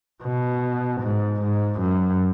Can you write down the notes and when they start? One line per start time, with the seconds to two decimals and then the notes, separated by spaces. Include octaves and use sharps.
0.23 B2
1.01 G#2
1.40 G#2
1.79 F#2